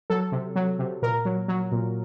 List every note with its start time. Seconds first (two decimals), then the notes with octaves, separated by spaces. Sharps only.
0.10 F#3 A4
0.32 C3
0.56 F#3
0.79 C3
1.02 A#2 A#4
1.25 F#3
1.48 F#3
1.72 A#2